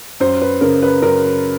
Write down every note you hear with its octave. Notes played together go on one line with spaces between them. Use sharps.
F#2 C5
B4
C#3 A#4
B4
F#2 A#4